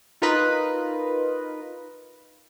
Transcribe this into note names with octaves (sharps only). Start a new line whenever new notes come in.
D#4 F4 A#4 B4 D#5